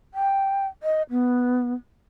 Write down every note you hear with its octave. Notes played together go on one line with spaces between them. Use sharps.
G5
D#5
B3